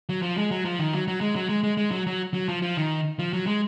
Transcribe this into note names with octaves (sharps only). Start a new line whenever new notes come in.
F#3
F3
G#3
F#3
F3
D#3
F#3
F#3
G#3
F#3
G#3
G#3
G#3
F#3
F#3
F#3
F3
F3
D#3
F3
F#3
G#3